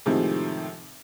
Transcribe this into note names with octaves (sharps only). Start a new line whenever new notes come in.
A2 C3 D#3 F3 G#3